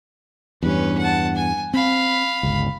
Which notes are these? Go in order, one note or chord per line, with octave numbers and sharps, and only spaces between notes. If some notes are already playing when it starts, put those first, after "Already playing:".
E2 G2 C#4 B4
F#5 A5
G#5
C4 F5 B5
G1 C#2